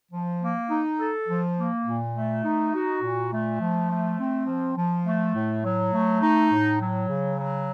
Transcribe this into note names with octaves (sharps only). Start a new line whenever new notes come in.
F3
A#3
D#4
A4
F3
A#3
A#2
A3
D#4
F#4
A#2
A3
F3
A3
C4
F3
F3
A3
A2
F#3
A3
D#4
A2
F#3
C#3
F#3